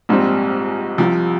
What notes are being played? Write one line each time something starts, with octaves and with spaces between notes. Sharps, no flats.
A#1 G#2 G3 C4
C2 C3 F3